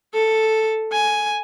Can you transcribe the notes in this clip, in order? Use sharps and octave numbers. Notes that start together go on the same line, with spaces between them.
A4
G#5